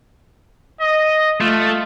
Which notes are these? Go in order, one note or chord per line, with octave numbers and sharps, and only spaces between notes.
D#5
A3 F4